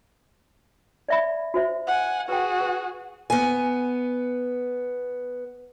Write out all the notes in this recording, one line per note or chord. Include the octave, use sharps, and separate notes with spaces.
D5 E5 B5
F#4 C5 E5
F#5 G#5
F#4 G#4 B4 G5
B4
B3 G#5